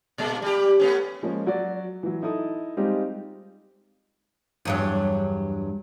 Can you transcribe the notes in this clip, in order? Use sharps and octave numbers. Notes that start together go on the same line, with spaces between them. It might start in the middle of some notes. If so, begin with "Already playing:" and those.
A#2 G#3 A#3
G3 G4
A3 B3 C#4
F3 G#3 A#3 C#4
F#3 F#4 D5
E3 F#3
D#4 E4 A4 D#6
G3 G#3 C4 D#4 F4 G4
E2 G2 F#3